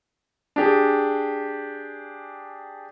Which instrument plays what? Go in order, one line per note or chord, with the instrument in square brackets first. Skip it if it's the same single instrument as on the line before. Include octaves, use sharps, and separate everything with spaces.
[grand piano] D4 G4 G#4